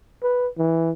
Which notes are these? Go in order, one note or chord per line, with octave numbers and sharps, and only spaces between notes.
B4
E3